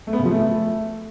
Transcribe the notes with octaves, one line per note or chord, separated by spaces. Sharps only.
A3
B3
C#3
F3
A3